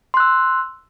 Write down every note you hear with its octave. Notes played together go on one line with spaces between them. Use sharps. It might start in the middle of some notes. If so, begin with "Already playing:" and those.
C6 E6 F#6